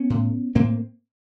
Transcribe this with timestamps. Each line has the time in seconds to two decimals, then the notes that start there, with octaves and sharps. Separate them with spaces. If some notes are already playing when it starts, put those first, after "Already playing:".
Already playing: B3 C#4
0.10 A2
0.55 A2 A#3 C4